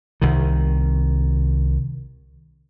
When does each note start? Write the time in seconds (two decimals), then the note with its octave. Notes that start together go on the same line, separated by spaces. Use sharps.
0.21 C2 D#3